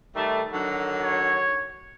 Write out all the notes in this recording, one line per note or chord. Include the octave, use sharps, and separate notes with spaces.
D#3 G3 A3
D3 D#3 F#3
C#5